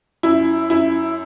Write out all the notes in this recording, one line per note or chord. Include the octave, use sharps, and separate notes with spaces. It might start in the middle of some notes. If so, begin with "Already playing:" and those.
F#2 E4
F#2 E4